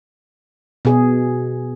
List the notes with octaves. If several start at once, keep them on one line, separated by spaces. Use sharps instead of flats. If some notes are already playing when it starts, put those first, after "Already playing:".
B2 G#4